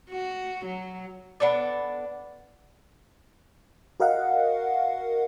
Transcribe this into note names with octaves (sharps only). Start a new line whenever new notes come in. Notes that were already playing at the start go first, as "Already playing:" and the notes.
F#4
F#3
B3 D4 A4 D5
F#4 A#4 D#5 F5 F#5